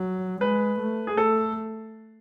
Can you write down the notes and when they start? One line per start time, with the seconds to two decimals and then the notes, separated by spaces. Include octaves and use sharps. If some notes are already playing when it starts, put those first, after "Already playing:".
Already playing: F#3
0.41 G#3 B4
0.79 A3
1.07 G#4
1.16 A3 A4